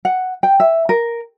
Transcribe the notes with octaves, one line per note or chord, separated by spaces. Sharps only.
F#5
G5
E5
A#4